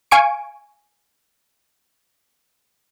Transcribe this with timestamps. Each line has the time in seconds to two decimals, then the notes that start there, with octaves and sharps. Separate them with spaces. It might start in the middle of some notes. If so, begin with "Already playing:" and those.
0.11 F5 G#5 C#6 D7